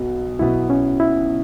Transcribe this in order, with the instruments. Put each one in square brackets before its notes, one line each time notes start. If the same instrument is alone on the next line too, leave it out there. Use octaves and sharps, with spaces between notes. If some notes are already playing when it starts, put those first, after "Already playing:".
Already playing: [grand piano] B1 B2 B3 [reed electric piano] F#4
[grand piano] B1 B2 B3 [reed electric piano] E4
[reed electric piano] C#4
E4